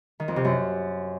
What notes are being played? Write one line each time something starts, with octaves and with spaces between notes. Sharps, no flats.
D#3
F2
C3
F#2